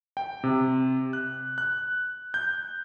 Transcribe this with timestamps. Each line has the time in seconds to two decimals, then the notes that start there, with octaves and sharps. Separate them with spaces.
0.17 G5
0.44 C3
1.13 F#6
1.58 F#6
2.34 G6